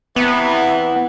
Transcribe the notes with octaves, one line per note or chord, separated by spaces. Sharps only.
C3 E3 B3